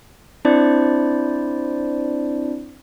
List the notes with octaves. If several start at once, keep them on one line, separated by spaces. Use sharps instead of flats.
C4 D4 E4 C5 D5